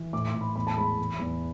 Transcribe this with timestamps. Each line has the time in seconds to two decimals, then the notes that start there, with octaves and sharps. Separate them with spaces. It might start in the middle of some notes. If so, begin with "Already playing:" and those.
Already playing: E3
0.13 A2 D6
0.27 C6
0.34 A2
0.41 B5
0.56 E2 B5
0.67 A5
0.77 G#3 B5
0.99 E2
1.20 E2